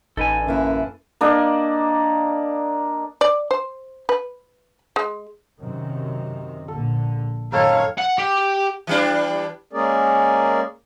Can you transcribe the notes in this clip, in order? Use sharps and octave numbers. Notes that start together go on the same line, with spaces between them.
A1 D#4 A4 B4 G#5
F#2 D3 A#3 E4
A#3 D4 D#5
D5
C5
B4
G#3
F#2 C3 D#3
A#1 D3 A4
F#2 A#2 D#3 C4 A4 A#4 C#5 F5
F#5
G4
E3 G3 D4
G#3 A#3 C#4 G#4 A#4 D5